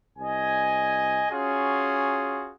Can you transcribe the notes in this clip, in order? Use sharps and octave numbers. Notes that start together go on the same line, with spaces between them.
C2 D#5 G#5
C#4 F4 F#4 G#4